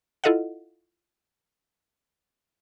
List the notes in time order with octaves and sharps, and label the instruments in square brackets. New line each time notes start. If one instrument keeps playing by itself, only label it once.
[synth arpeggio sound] E4 F4 A4 D#5 F5 F#5